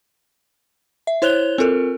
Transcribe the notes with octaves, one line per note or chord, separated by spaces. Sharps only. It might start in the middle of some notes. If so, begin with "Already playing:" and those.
E5
E4 C5 C#5 F#6 F7 G7
C4 F4 A4 A#4